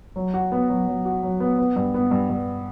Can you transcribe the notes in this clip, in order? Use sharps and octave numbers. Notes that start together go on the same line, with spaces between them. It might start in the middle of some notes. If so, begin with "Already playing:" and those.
F#3
F#4
B3
F#3
F#3
F#4
F#3
B3
B3
G2
B3
G2
G2